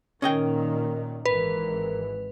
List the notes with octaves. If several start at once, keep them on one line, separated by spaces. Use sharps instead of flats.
A#2 D#3 C#4 A#4 D#5 G5
G#1 E3 A#4 B4